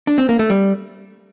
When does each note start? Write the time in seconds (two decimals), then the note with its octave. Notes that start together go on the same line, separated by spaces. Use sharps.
0.07 D4
0.18 C4
0.29 A#3
0.39 A3
0.50 G3